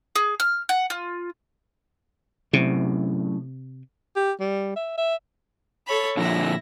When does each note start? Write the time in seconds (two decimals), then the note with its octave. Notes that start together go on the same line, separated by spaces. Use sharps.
0.16 G#4
0.40 F6
0.69 F#5
0.90 F4
2.53 F#2 A2 C3
4.16 G4
4.40 G3
4.76 E5
4.98 E5
5.86 A4 C#5 B5
6.17 A#2 D3 F3 E4 A#6